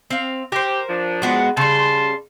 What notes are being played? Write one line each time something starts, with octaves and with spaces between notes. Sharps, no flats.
C4 F5
G4 A#4 C5
F3 D4
G#3 B3 F#4
C#3 G3 A5 C6